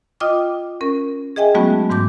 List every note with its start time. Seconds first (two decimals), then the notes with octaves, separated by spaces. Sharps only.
0.20 F4 D#5 G5 D6 D#6
0.81 C#4 A#4
1.36 G#4 D#5 E5 G5 G#5
1.55 F#3 G#3 A3 B3 C#4 F#4
1.90 G#2 E3 A3 D6 G6